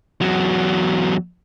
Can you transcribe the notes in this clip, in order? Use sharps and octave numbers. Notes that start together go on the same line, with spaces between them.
E2 F#3